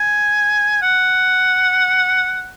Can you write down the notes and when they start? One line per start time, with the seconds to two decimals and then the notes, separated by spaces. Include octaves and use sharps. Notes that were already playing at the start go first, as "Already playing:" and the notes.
Already playing: G#5
0.82 F#5